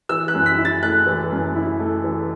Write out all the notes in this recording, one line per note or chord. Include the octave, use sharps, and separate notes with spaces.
E3 E6
F#6
F#2
B6
E4
A6
A3 F#6
E3
F#2
E4
A3
E3